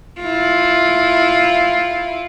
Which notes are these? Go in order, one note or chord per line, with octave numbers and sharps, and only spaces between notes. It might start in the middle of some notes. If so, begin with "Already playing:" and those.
E4 F4